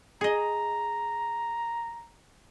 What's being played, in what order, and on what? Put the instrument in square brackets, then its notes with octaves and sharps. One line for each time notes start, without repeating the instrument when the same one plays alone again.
[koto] G#4 D#5 [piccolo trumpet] A#5